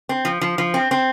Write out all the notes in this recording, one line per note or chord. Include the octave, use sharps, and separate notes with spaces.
C4
F3
F3
F3
C4
C4